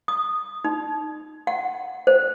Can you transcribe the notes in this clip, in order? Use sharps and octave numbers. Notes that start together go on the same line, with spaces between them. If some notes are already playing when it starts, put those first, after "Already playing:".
D#6
D#4
F#5
C5